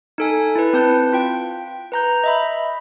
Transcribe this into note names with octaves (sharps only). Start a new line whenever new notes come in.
D#4 A4 G#5
E4 B4
C4 B4 A5 G6
F4 G5
B4 A#5 G6
D#5 E5 B5